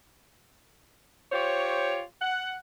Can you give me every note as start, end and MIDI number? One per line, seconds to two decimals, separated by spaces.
1.32 2.01 65
1.32 2.01 67
1.32 2.01 72
1.32 2.01 73
2.21 2.55 78